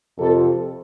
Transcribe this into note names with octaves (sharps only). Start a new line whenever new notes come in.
F2 C3 F3 A4